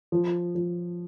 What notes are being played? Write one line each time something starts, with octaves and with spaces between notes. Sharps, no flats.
F3
F3